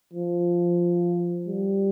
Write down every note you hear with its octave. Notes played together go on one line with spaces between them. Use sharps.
F3
G3